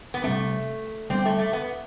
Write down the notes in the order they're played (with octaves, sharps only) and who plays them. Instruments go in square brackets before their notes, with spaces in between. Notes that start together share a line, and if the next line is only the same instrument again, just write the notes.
[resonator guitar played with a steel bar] B3
[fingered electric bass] C3 G3 C4 [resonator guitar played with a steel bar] A3
[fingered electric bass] D3 G3 B3 [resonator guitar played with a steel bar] C4
[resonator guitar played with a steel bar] A3
A3
B3